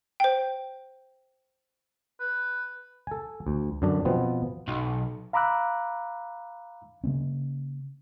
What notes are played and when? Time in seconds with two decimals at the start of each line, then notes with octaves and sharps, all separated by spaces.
0.20 C5 G5
2.20 B4
3.07 A4 G#5
3.47 D2
3.82 F#2 D3 D4
4.05 B2 F3 B3 C4
4.68 B1
5.33 F5 A#5 B5 D6 E6 F#6
7.04 C#3 A#3 C#4